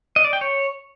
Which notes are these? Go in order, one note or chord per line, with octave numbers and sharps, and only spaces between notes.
D#5
D5
G5
C#5